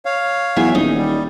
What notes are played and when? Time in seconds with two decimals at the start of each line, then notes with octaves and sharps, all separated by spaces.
0.05 C#5 F5
0.56 E2 F#3 E5 G#5
0.75 D#1 D#4
0.97 G3